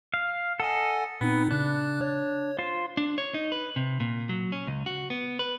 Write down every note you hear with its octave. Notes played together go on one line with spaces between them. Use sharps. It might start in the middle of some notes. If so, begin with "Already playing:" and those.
F5
A4 D#5 F#5 G#5
A#2 B3 C4 D#4
C#3 D4 F#6
C#5
F4 C5
D4
C#5
D#4
B4
C3
A#2
F#3
C#4
C#2
F#4
B3
B4